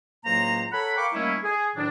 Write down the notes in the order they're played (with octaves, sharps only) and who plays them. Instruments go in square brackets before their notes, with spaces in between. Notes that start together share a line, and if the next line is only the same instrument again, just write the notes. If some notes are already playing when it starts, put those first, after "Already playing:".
[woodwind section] C#2 A2 F#3 A#3 C5 A#5
A4 C#5 F#5 A#5 B5
A#4 F5 G5 B5 C#6 D6
D#3 G3 A3 A#3 C#4 E4
G#4
D2 A2 D#3 F#3 D4